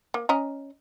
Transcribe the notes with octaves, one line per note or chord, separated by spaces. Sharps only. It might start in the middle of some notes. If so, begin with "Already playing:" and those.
A#3
C#4 D#5 A#5